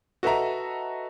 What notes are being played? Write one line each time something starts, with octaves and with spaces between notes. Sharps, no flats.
F#4 A4 B4 D#5 E5 A#5